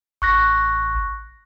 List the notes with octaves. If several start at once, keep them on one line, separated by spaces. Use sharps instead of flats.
A1 C#6 F#6 A#6